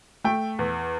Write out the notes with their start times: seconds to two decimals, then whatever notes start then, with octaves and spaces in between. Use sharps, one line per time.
0.24 A3 G5
0.59 E2